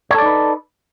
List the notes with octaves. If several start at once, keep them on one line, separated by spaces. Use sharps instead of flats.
D#4 A4 B4 C#5 D5